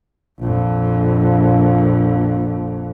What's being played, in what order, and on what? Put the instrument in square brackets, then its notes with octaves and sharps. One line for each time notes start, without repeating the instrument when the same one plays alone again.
[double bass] A#1 F2